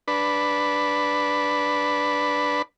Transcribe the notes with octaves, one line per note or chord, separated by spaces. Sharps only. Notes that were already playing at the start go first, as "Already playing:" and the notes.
D4 B4